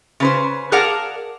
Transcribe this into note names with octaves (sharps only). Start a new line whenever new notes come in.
C#3 B4 C5
G#4 A#4 D5 F5 F#5 A5